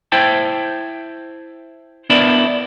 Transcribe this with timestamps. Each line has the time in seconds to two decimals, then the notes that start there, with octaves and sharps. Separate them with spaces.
0.12 E4 C5 E5 G5 A5
2.10 B3 D4 E4 A#4 D5 A5